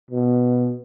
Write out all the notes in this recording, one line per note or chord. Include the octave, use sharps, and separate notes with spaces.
B2